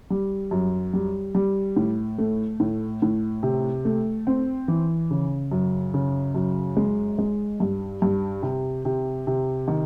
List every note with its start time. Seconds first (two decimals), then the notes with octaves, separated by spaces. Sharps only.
0.10 G3
0.51 F#2
0.93 G3
1.35 G3
1.77 A2
2.18 A3
2.60 A2
3.02 A2
3.43 C3
3.85 A3
4.27 C4
4.68 E3
5.11 C#3
5.51 F#2
5.94 C#3
6.35 F#2
6.77 G#3
7.18 G#3
7.60 G2
8.02 G2
8.42 C3
8.85 C3
9.27 C3
9.68 D#3